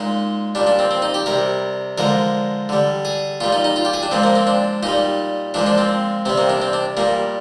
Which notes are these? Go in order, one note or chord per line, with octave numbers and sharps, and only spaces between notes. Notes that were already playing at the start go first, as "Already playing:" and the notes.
Already playing: A#2 G#3 D#4
A#2 G3 D4
D4
C4
C4
D#4
G4
C3 G3 A#4
D3 F3 G#3 A#4
D3 G3
G#4
A#2 G3 F4
D#4
D#4
F4
G4
G#4
D4
A#2 F3 G#3 C4
A#3
C4
D4
A#2 G3 D#4
A#2 F3 G#3 D4
D4
C4
C3 G3 C4
A#3
D4
C4
D4
A#2 G3 A#3